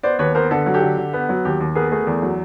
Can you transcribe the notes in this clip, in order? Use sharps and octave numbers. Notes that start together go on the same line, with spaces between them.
B3 C5 D5
D#2 B4 C#5
B3 A#4 C5
D3 A4 B4
F#3
G4 A4
D3
D3
B3
F#3
D#2 G4
D#2
B3 G#4 A#4
A3 G#4 A#4
E2
F#3